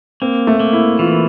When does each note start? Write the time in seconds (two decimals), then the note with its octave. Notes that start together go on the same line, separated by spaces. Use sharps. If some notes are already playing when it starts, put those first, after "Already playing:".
0.22 A#3 C4
0.47 A3
0.60 A#3
0.73 E4
0.99 E3 F4